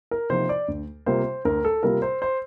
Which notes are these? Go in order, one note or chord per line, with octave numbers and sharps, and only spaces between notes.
A#4
C3 F3 A#3 D#4 C5
D5
D2
C3 G3 A#3 F4 C5
D2 A#4
A4
C3 G3 A#3 F4 A#4
C5
C5